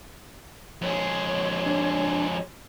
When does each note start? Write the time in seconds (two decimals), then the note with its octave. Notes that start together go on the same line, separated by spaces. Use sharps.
0.82 F2 G#3 C#5
1.66 D4